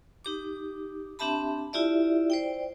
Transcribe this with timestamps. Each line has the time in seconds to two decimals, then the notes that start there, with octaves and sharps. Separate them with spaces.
0.25 D#4 G4 D6
1.19 C4 D4 G4 E5 A5 B5
1.73 E4 F4 G4 D5 E5
2.30 C5 D5 G5